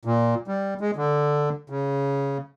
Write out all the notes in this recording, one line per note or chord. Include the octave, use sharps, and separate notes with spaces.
A#2
G3
G#3
D3
C#3